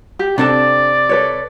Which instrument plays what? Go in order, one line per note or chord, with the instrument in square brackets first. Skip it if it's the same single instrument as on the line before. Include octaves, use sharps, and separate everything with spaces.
[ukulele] G4
[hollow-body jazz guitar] C3 C4 A5 [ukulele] D4 A4 [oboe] D5
[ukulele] A4 B4 C#5